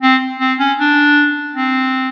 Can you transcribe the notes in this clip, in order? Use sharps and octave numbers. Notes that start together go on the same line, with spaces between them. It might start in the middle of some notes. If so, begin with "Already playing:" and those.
C4
C4
C#4
D4
C4